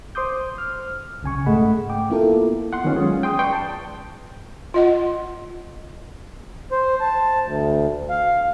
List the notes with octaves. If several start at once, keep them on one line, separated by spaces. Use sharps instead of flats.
C5 C6 D6 D#6 G6
F6
B1 C#3 G#5 C#6
G#2 A3 G#4 D#5 F#5 B5
G5 D6
A#3 B3 E4 F4 A4 A#4
F#5 C6
D#3 G3 B3 C#4 F4
F#3 G#3 C#4 F4 G#4
G5 C6 D#6
B4 D5 G5 C6 C#6
A5
F4 D#5 F#5
C5
A5
D2
F5